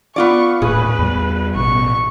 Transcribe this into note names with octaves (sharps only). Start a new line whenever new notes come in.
B3 F4 D5 C#6
D#1 A2 G#4 B4
E2 G3
A1 B2 C#6